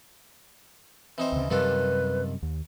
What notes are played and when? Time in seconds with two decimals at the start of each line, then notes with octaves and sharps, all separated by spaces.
1.18 E3 C4 D#4 C5
1.32 D2 C#3
1.51 F#2 C3 D#3 G3 F4 A4 B4
2.43 D#2